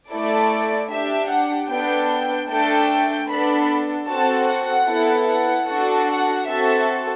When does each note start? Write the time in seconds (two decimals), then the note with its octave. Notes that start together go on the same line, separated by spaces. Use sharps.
0.11 A3 E4 A4 D5
0.90 D4 G4 E5
1.30 F#5
1.70 B3 D4 A4 G5
2.50 A3 D4 A4 G5
3.29 B3 D4 A4 B5
4.09 C4 F#4 A4 A5
4.48 F#5
4.88 B3 E4 A4
5.29 F#5
5.68 D4 F#4 A4
6.08 F#5
6.47 C4 F#4 A4 E5